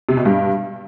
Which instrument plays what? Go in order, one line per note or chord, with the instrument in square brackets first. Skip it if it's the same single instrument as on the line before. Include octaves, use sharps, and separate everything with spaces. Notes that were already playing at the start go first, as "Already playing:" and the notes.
[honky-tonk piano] C3
B2
G2